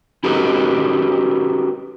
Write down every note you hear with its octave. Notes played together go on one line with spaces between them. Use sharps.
C#4 D#4 F#4 G4 A4 B4